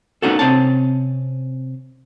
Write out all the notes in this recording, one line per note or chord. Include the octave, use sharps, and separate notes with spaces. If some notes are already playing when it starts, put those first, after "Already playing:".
A#3 B3 C#4 D#4 F#4 A4
C3 G#3 C4 C#4 C#5 A5